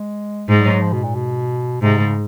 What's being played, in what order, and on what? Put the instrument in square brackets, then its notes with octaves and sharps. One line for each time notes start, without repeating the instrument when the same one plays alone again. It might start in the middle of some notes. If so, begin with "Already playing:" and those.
Already playing: [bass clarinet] G#3
[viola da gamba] G#2
[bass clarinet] G3
F#3
F3
B2
A#2
B2
[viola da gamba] G#2 [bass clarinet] C3
[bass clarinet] C#3